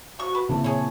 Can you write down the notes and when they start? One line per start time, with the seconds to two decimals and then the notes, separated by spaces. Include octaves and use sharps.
0.19 C3 F#4 C#6
0.35 B4
0.49 C#3 A#3 C4 E4 A5
0.64 A#2 G#4 C#5